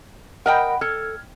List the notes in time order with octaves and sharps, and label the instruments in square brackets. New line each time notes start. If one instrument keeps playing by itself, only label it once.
[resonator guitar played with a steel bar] A#4 D#5 G5 [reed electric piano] F#5 B5
[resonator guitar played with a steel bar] A4 [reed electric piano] F6 G#6